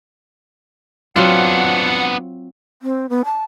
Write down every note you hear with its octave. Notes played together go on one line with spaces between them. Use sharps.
F#3 B3 C4 D4 F4 F#5
C4
B3
A5